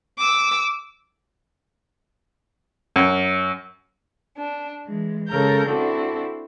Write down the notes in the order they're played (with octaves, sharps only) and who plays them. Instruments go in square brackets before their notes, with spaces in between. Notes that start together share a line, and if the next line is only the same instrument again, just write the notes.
[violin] D6 E6
[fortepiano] F#2
[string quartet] D4
E3 G#3
C#3 G#3 A4 A#4 A#5 G6
C4 D4 E4 F#4 A4